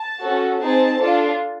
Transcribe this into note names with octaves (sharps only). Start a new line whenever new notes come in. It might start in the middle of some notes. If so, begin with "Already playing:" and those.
Already playing: A5
C#4 F#4 A4
C4 D#4 G#4 A5
D4 F4 A4